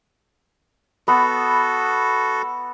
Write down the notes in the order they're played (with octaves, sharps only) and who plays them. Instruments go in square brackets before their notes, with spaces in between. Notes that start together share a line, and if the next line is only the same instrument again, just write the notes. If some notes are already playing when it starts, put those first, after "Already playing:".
[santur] B3 B5 [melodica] F#4 A4